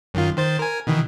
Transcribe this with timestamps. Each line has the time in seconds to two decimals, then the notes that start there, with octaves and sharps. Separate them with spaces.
0.14 F#2 D#3 F4
0.37 D#3 C5 A6
0.59 A#4 G#5
0.87 B2 D#3 E3